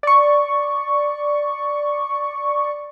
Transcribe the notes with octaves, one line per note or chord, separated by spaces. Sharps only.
D5 C#6